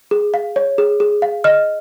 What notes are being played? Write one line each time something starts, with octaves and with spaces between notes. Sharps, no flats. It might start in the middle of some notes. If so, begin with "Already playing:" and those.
G#4
F5
C#5
G#4
G#4
F5
D#5 F6